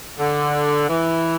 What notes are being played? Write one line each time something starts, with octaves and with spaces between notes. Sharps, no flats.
D3
E3